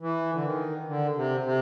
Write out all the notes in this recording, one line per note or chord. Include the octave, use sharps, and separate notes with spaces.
E3
D3
D#3
D3
C3
C3